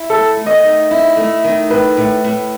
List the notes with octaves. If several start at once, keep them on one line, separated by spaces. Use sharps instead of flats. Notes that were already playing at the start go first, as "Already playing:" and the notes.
Already playing: E4
A3 A4
A3
D#5
D#3
E4
A3
D#3
A2 B4
A2
A2